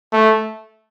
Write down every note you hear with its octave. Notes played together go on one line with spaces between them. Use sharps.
A3